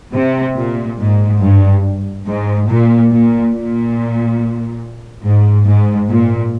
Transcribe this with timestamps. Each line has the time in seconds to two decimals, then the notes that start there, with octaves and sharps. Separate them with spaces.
0.13 C3
0.55 A#2
0.98 G#2
1.41 G2
2.27 G#2
2.68 A#2
3.11 A#2
3.54 A#2
5.24 G#2
5.67 G#2
6.10 A#2